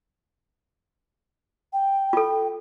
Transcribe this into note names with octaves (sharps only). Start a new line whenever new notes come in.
G5
F4 A4